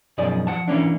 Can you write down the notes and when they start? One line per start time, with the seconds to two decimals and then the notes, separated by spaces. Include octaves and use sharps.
0.18 B1 F#2 F3 G#4 D5
0.47 F3 F#5 A5
0.68 E3 A#3 C#4 D4